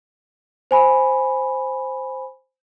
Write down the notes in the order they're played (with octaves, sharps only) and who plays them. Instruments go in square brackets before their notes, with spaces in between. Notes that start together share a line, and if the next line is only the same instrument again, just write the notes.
[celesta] C5 G#5 B5